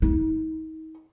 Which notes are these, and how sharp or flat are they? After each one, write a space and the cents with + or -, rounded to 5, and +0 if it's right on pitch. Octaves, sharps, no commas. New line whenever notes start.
D#4 +35